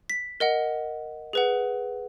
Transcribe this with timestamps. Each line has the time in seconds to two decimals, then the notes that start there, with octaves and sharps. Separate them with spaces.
0.10 B6
0.40 A#4 D#5 F#5
1.33 G#4 B4 F#5